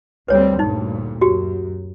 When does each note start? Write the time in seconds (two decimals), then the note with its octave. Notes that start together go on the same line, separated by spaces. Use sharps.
0.28 D2 G3 C4 B4 C#5
0.59 D2 G2 A#2 D#4
1.21 F#2 F#4 G4